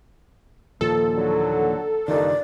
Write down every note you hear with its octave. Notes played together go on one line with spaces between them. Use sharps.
D#2 A#2 F3 A4
D3 F#3
F#1 G2 A#2 D#3 D#4 D5